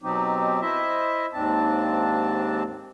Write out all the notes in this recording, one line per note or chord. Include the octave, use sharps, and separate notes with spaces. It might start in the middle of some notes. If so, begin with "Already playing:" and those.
B2 F#3 C4 D#4 G4
E4 C5 D#5 E5
D#2 G#2 C4 D4 A5